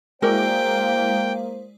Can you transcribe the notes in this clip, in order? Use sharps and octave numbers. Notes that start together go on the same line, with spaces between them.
G#3 A#3 E4 F#4 A#4 C5 D5 G5